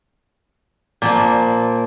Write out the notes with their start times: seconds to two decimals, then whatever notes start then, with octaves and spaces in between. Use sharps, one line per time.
1.02 A#2 F3 A#3